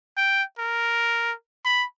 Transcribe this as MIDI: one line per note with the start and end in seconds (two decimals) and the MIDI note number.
0.17 0.43 79
0.59 1.32 70
1.65 1.84 83